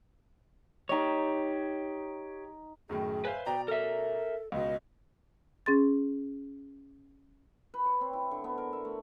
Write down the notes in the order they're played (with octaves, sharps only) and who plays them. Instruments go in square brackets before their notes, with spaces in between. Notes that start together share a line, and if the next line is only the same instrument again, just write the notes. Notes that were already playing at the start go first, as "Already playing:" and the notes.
[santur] D#4 D#5 [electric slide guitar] G4 C#5
[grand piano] F#2 A2 D#3 [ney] G#4
[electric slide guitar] B4 C5 [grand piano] E5 F5 G#5
[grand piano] B2 D5 A#5 [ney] G5
[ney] A4 [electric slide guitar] A#4 E5
[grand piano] C#2 B2 [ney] D#5
[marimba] C#4 G#4 C6 A6
[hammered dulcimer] B4
C#5
C4
E4
D3
B3
A#4
E5
A3